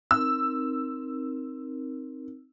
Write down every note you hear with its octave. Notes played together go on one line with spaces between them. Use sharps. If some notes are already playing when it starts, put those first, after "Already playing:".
C4 D#4 A#4 E6